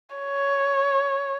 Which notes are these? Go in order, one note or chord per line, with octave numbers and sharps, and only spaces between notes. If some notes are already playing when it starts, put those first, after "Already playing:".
C#5